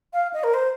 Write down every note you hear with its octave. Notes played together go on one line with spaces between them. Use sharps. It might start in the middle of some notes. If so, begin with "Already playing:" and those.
F5
D#5
A#4
C5